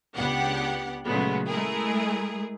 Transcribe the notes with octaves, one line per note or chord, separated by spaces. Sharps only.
C#2 B3 D4 G4 F#5
A#2 C#3 F#3 G#3 A3 B3
G#3 A3 E4 G#4 A#4